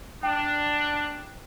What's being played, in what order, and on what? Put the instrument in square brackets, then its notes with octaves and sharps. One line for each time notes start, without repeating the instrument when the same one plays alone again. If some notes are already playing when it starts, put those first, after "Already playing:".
[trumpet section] D4 [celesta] G5